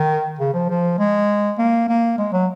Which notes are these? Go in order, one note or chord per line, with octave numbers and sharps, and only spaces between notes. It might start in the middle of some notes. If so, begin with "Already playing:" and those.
Already playing: D#3
C#3
F3
F3
G#3
A#3
A#3
G#3
F#3